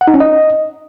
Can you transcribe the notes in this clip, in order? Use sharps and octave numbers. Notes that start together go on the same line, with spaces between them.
F#5
D#4
C#4
D#5